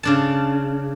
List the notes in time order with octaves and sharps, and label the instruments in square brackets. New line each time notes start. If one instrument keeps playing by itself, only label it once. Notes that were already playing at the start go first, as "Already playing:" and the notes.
[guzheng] C#3 D4 A5